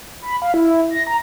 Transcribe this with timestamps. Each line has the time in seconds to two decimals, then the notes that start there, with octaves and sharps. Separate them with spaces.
0.22 B5
0.42 F5
0.54 E4
0.90 A#6
1.07 A#5